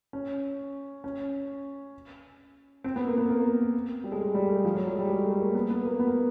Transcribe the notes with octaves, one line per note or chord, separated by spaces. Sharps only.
C#4
C#4
C4
B3
A#3
B3
A#3
G3
G#3
A3
G3
A3
F3
F#3
G#3
G3
G#3
A3
A#3
B3
B3
A#3
B3
A#3